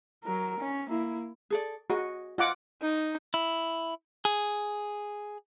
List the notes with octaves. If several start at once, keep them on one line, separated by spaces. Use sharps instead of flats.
F#3 A#4
C#4
A#3 E4
G#4 A4 D5
F#4 G#4 D#5
F4 D#5 F#5 D6
D#4
E4
G#4